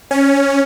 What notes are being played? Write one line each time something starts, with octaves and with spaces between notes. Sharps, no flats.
C#4